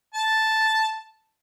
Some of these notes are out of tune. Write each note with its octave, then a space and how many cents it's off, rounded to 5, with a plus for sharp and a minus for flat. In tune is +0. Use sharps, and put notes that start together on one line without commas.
A5 +0